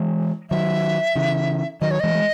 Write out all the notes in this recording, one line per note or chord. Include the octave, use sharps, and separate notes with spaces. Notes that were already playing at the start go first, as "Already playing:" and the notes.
Already playing: E3 G#3
D#3 F#3 E5
C#3 E3
D#3 F#3 D#5
C#5
E3 G#3 D#5
G#3